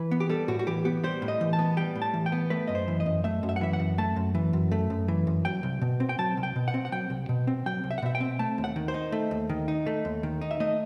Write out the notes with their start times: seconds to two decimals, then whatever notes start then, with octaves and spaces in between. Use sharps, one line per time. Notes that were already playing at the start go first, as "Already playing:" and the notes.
Already playing: E3 B4
0.11 B3
0.20 G4
0.29 G3 A4
0.48 A2 F#4
0.59 F#4
0.67 E3 G4
0.85 B3 G4
1.04 G3 C5
1.22 A2
1.28 D#5
1.41 E3
1.53 A5
1.59 B3
1.77 G3 G5
1.95 A2
2.02 A5
2.14 E3
2.26 G5
2.32 B3
2.50 A3 B4
2.67 F#2 D#5
2.75 C5
2.88 E3
3.00 D#5
3.06 F#2
3.24 A3 E5
3.43 F#2
3.49 E5
3.56 F#5
3.61 E3 E5
3.73 F#5
3.80 F#2
3.98 A3 A5
4.16 F#2
4.35 E3
4.53 F#2
4.72 A3
4.90 F#2
5.08 E3
5.27 F#2
5.45 F#3 G5
5.63 C2
5.81 B2
6.00 C4
6.09 G5
6.18 F#3 A5
6.37 C2
6.43 G5
6.56 B2
6.68 F#5
6.74 C4
6.85 F#5
6.92 F#3 G5
7.10 C2
7.29 B2
7.47 C4
7.66 F#3 G5
7.84 C2
7.91 E5
7.98 F#5
8.02 B2 E5
8.15 G5
8.20 C4
8.39 A3 A5
8.58 D#2
8.64 F#5
8.76 D#3
8.88 C5
8.94 D#4
9.12 A3
9.31 D#2
9.49 D#3
9.68 D#4
9.86 A3
10.05 D#2
10.23 D#3
10.41 D#4
10.51 E5
10.60 A3 D#5